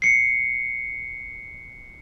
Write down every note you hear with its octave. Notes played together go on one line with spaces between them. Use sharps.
C7 C#7